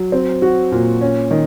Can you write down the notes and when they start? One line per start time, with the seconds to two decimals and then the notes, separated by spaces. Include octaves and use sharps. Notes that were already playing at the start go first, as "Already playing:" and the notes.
Already playing: F#3
0.12 C4
0.42 F#4
0.72 A#2
1.01 C#4
1.31 D#3